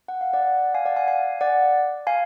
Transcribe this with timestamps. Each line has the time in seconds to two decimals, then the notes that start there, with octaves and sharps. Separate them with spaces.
0.08 F#5
0.21 F5
0.33 D5 F#5
0.74 F5 G#5
0.85 D5 F#5
0.96 F5 G#5
1.08 F5 G#5
1.41 D5 F#5
2.07 F5 G#5